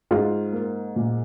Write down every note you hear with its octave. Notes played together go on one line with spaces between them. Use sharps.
G#2 F4
A#3
A#2